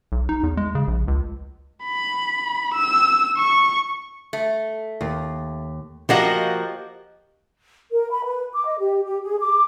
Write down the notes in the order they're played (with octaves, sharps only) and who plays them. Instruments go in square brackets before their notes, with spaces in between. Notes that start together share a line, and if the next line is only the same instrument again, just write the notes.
[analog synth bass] B1
D#4
E2
G#3
C#3
A#1
C#2
[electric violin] B5
E6
C#6
[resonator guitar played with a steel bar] A3
[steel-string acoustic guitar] D#2
[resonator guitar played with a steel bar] F3 A#3 F#4 [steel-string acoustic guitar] G4 D#5 F#5
[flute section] A#4
B5
B4
D6
D#5
G4
G4
G#4
D6